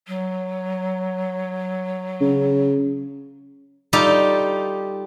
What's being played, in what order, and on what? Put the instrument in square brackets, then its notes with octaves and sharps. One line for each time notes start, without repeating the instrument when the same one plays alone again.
[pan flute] F#3
[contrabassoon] C#3
[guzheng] G3 D#4 F4 G4 A4